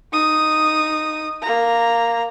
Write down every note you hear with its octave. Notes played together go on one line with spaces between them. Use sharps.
D#4 D#6
A#3 A#5